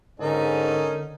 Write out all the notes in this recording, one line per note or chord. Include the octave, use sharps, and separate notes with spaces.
G#2 D3 C#4 D#4 A4 A#4